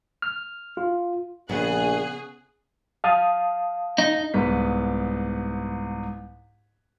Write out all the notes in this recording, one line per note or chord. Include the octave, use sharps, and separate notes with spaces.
F6
F4
A#1 C#3 B3 G#4 F#6
F5 A5 D#6
D#4
C2 G#2 B3 B6